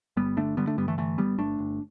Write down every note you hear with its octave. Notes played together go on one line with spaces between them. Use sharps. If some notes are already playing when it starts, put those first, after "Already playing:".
G1 G3 B3
D3 A3 D4
D3 G3 B3
A3 D4
G2 G3 B3
E3 A3
D3 E3 A3
G1 G3 B3
G1 A3 D4
G1